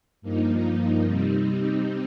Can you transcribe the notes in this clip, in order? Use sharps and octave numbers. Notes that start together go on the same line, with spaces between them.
G2 F3 A#3 D#4
C3 G3 C4 D#4